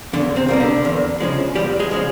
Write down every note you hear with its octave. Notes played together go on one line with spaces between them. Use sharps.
E2 D3 D4
C3 C4
B2 G3 A#3
D3 D4
E2
C#3 F3 G#3
E2 G3 G4
G#3 G#4
C#3 F3 G#3